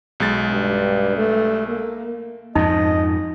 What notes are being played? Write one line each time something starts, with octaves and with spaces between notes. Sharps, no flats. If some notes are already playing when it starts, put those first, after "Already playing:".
B1 G#3 A6
G2
A3
A#3
F2 G#2 F3 D#4 D#5